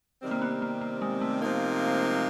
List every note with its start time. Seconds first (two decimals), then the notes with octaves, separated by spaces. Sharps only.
0.22 C3 D#3 G3 C4
0.31 A#3
0.42 B3
0.62 A#3
0.81 A#3
1.02 G#3
1.21 A3
1.41 C3 F3 A#3 D#4